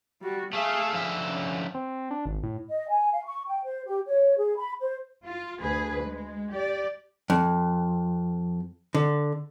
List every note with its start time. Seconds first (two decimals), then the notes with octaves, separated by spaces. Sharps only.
0.22 G3 F#4
0.53 A3 G#4 E5 F5
0.92 D3 F3 E5
1.25 C#4
1.74 C4
2.11 D4
2.26 G#1
2.43 A2
2.69 D#5
2.89 G#5
3.12 F5
3.25 C#6
3.47 G5
3.64 C5
3.86 G4
4.07 C#5
4.37 G#4
4.57 B5
4.80 C5
5.23 F4
5.61 D2 G#4 B4
6.04 G#3
6.50 G4 D5
7.30 F2
8.95 D3